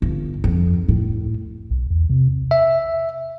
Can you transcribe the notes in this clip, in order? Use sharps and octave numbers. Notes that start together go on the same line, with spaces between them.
G1
F2
A2
B1
E2
C3
E5